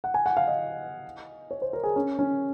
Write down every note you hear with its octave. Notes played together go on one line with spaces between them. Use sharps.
F#5
G#5
F#5
F5
D#5
C#5
C5
A#4
G#4
C#4
C#4